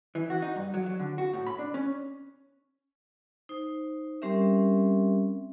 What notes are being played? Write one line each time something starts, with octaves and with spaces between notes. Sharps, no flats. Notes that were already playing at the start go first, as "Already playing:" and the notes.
E3
F#4
D#4
G2
F#3
F#3
D3
F#4
A2
B5
D4
C#4
D#4 C5
G3 C4 C#4 G4 A#4 E5